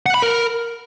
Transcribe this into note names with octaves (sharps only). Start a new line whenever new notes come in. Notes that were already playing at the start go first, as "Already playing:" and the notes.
F#5
B5
A#4